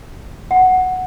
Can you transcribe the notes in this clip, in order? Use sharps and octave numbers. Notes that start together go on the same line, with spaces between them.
F#5